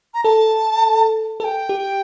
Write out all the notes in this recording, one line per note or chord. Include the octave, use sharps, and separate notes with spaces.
A#5
A4 A5
A4 A5
G5
G4